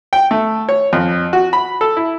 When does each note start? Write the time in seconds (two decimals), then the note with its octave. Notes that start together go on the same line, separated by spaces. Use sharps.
0.13 G5
0.31 A3
0.69 C#5
0.93 F2
1.33 F#4
1.53 B5
1.81 A4
1.97 E4